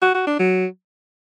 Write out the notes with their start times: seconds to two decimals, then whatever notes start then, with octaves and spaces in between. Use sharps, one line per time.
0.02 F#4
0.15 F#4
0.27 D4
0.40 F#3